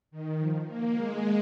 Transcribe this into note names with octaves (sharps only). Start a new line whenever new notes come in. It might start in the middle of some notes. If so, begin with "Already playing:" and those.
D#3
F3
A#3
G#3